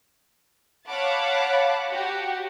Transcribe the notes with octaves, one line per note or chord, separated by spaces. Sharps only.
C#5 F5 F#5 A5 B5 D6
F#4 G4